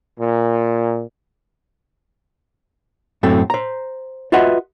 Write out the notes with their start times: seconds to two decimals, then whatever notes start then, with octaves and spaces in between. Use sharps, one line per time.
0.19 A#2
3.23 F#2 A2 A3 C4
3.50 C5 A#5
4.32 F4 F#4 B4 D#5 E5 F#5